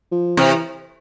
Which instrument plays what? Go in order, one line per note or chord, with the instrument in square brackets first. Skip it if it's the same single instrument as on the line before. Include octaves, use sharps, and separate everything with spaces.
[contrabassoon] F3
[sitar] C3 [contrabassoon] E3